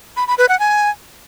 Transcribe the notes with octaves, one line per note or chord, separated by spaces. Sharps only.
B5
B5
B4
F#5
G#5